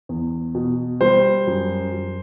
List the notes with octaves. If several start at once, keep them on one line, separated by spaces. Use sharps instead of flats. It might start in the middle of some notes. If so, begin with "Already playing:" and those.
E2
B2
G3 C5
F#2
F#2